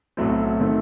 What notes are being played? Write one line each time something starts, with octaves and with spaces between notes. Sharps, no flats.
B1 A2 F#3 A3 C4
D#3 A3 C4